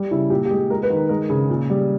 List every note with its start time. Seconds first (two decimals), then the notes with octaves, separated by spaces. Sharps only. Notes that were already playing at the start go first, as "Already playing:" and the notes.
Already playing: G3
0.11 C#3 E4
0.30 A#2 G4
0.45 G4
0.51 G#3 G#4
0.70 G#3 A#4
0.83 B4
0.90 D#3
0.97 A#4
1.09 G#3 A#4
1.29 C#3 G#4
1.50 A#2
1.70 G3